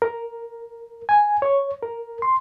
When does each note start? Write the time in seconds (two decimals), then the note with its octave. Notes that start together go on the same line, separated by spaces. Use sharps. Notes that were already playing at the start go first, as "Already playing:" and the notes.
0.02 A#4
1.09 G#5
1.42 C#5
1.83 A#4
2.22 C6